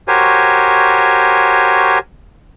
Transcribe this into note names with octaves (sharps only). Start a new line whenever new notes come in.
F#4 G4 A#4 C5 C#5 G#5